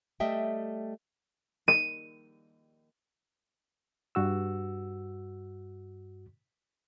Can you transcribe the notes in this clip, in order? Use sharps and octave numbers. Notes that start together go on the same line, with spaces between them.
G3 A3 D#5 E5 G5
D#7
G2 F#4 E6